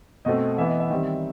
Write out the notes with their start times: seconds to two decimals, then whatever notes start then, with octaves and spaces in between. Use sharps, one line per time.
0.25 B2 A3 C4 D#5
0.58 E3 B3 E5
0.69 D#5
0.80 E5
0.90 D#3 G3 C4